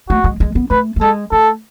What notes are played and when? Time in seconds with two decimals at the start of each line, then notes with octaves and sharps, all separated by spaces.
0.09 A3 F#4
0.24 G#3
0.40 G#3
0.55 B3
0.70 A3 B4
0.96 A3
1.01 G#3 A4
1.31 A3 A4